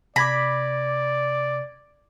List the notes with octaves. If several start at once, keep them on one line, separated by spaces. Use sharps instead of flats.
C3 D5 B5 D6 G#6 A#6